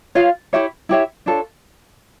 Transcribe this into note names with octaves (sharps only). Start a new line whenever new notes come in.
F4 C#5 F5
E4 G4 C#5 E5
E4 G4 C#5 E5
D4 F4 A4 C#5